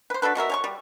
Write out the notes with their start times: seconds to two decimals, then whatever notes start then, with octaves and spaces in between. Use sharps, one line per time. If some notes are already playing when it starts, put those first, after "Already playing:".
0.10 B4 C5
0.22 D4 F#4 A4 B4
0.35 B2 F#4 A#4 E5
0.49 C#5 G#5 C#6
0.64 G3